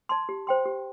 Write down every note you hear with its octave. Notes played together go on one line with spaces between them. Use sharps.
D5 A5 C6
G4
C5 G5 C6
G4